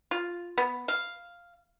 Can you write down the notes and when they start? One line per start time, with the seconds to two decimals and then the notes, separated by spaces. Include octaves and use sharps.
0.11 F4
0.58 B3
0.88 F5